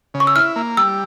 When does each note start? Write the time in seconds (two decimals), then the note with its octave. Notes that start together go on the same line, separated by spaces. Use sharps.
0.14 C#3
0.20 C#6
0.27 E6
0.36 E4 F6
0.56 A#3
0.77 G3 E6